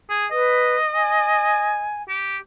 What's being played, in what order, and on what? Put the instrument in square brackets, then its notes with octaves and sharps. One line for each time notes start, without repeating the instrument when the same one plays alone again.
[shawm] G#4
[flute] B4 [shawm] D#5
[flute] G#5
[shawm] G4